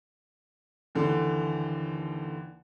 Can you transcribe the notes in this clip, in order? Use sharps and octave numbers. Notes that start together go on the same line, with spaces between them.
D#2 D3 E3